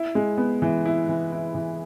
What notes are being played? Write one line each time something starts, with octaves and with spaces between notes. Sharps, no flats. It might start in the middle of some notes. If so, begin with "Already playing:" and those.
Already playing: E4
G#3
B3
E3
E4
E3
E4
E3